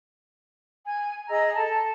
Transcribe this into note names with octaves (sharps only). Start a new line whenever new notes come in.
G#5
G#4 D#5 A#5 E6
A4 A5